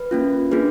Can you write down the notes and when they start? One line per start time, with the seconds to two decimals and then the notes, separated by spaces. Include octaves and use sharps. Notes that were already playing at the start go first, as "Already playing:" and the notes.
Already playing: B4
0.11 A#3 C#4 F4
0.52 A#3 D4 F4 G#4 B4